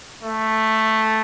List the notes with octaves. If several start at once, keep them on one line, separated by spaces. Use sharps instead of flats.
A3